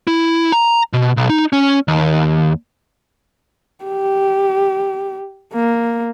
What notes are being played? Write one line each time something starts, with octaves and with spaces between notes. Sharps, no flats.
E4
A#5
B2
B1
D#4
C#4
D#2
G4
A#3